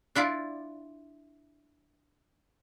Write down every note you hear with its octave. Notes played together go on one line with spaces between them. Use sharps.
D4 E4 F4 D5